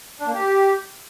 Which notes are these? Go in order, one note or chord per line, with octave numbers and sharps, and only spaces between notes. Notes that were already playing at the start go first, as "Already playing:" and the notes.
D4
A#3
G4